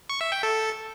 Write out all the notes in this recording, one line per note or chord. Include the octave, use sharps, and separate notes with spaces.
C#6
E5
G5
A4